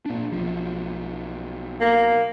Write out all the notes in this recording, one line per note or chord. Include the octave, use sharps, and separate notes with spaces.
A#2 D4
B1 F3
A#3